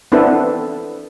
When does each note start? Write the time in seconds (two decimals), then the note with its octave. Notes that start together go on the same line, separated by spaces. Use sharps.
0.12 B3 C4 D4 E4 A4 B4